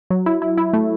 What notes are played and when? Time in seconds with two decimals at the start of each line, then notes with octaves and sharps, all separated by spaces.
0.10 F#3
0.26 E4
0.42 E4
0.58 E4
0.73 A3